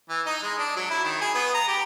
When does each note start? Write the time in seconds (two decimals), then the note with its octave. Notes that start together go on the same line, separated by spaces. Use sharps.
0.09 E3
0.26 D#4
0.43 G#3
0.58 D4
0.76 F#3
0.90 E4
1.03 D#3
1.21 G#4
1.35 B3
1.54 A#5
1.68 G4